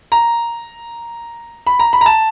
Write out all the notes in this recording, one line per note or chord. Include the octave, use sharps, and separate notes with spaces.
A#5
B5
A#5
B5
A#5
A5